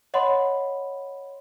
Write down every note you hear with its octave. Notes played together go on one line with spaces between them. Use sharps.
C#5 D#5 F#5 B5 C6